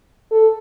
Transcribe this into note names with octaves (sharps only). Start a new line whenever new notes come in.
A4